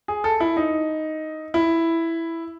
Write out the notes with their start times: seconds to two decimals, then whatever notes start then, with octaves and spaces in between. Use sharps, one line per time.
0.08 G#4
0.24 A4
0.40 E4
0.57 D#4
1.54 E4